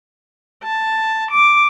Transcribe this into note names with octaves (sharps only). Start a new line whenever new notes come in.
A5
D6